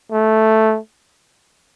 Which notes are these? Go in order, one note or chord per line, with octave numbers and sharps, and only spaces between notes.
A3